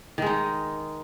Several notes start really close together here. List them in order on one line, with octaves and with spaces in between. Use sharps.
D#3 G#3 D#4